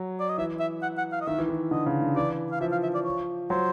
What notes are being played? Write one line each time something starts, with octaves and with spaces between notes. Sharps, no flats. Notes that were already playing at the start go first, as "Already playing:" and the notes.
Already playing: F#3
D5
D#5
E3 E5
E5
F#5
F#5
F5
D#5
D#3 E5
E3
D#3
D3 D#5
C#3
D3
E3 D5
F5
F3 E5
F5
E5
D5
C#5
F#3 C5